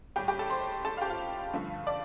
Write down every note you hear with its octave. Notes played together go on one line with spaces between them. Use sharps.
A2 G3 G4 G5
G4 G5
A4 A5
C5 C6
A4 A5
F5
G4 G5
F4 F5
G2 D3 F3 A3
D5